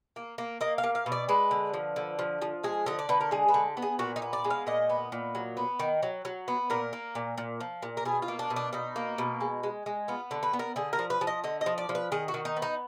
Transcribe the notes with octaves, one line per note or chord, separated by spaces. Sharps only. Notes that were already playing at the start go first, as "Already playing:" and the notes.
A#3
A#3
A#3 D#5
F5
A#3
F5
B2
D5
G#3 B4
D3
F3
D3
F3
F3
G#3 G#4
D3 D#5
D5
D3 B4
A#4
G#3 G#4
B4
D3
B3
G#4
A#2 F#4
D#4
B3
D5
G#3
F5
A#2 D#5
B3
A#2
F#3
B3
D#3
F#3
F#3
B3
A#2 A#4
A#3
A#2
A#2
F3
A#2
A#4
B2 G#4
F4
A#3
D4
B2
D4
B2 D#4
A#3
B2
G#3
G#3
G#3
B3 F4
D3
B4
B3
A#4
D3 G#4
A#4
F3
B4
F3
D#5
D3 D#5
D#5
F3
D5
F3
B4
D#3 G#4
F#4
D#3
D#4
B3
D#4